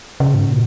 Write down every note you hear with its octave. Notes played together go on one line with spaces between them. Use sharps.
C#3
G#2
A#2